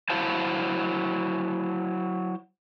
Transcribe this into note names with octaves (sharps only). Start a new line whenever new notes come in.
F#3 E4 C5 F5 A5